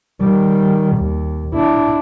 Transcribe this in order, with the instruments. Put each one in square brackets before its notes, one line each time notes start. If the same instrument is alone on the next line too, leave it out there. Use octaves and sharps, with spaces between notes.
[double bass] D#3 G3
D#2
D4 E4